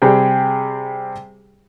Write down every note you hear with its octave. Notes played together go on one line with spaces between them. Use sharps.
C3 G3 G4 G#4 G5